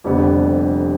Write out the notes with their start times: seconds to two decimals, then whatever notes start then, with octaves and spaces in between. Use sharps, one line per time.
0.04 F1 F2 D3 G3 B3